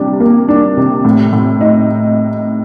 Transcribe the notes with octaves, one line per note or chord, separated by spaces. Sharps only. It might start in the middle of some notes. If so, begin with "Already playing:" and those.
Already playing: C3 G3 D4
A#3
D4
C3
A2
A2
D#4